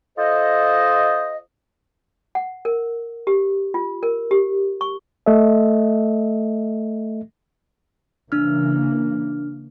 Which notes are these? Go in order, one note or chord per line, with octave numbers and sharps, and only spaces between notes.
F4 A4 C5 D#5
F#5
A#4
G4
F4
A#4
G4
C#6
A3 A4 D#5 E5
C#3 E3 A#3 D4 F6